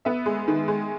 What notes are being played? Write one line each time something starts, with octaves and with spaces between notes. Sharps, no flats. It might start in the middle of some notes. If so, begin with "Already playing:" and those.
B3 E5
G#3
D#3
G#3